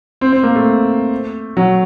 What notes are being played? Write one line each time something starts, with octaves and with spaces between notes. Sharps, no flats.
C4
C4
A#3
A3
F#3